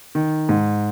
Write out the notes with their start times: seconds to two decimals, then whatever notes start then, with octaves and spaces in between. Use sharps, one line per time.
0.15 D#3
0.49 G#2